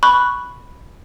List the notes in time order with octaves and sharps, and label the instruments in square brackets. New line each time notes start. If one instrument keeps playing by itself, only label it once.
[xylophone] B5 C#6 F#6